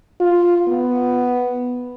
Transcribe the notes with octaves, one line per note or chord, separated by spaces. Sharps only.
F4
B3